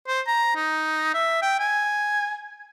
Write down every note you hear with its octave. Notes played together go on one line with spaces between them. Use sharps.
C5
A#5
D#4
E5
G5
G#5